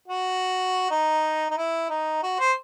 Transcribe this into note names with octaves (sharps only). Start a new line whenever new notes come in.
F#4
D#4
D#4
E4
D#4
F#4
C5